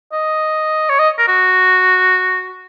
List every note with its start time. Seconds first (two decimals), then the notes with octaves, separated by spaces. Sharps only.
0.12 D#5
0.90 C#5
0.99 D#5
1.19 A#4
1.28 F#4